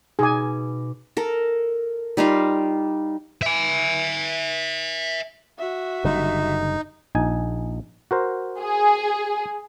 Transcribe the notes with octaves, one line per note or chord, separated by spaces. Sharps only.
B2 D#4 G#4 G#5 D6
A4 A#4
G3 D#4 F4 F5
E5 G#5
F#4 E5
F#1 D3 G3 D#4
A#1 D#4 G#5
F#4 A#4 C5
G#4